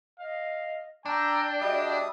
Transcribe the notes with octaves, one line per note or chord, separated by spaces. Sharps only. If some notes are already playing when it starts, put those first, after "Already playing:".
D#5 F5
D4 G5 A#5 C#6 E6
G3 F#4 G#4 D#5 E5 D#6